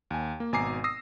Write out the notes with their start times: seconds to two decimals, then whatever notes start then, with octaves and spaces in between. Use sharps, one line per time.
0.10 D#2 G#5
0.40 A#3
0.52 G#1 B2 G#5 A#5 D6 C7
0.84 D#6 E6 A#6 C7